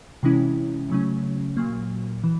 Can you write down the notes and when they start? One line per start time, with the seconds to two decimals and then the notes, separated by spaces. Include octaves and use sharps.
0.23 C3 E3 G#3 C#4 E4
0.90 C#3 F#3 A3 C#4
1.57 A#2 F#3 A#3
2.24 E3